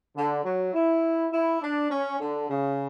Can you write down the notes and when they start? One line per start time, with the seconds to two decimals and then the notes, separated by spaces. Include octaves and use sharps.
0.16 D3
0.44 F#3
0.74 E4
1.32 E4
1.61 D4
1.90 C#4
2.19 D3
2.49 C#3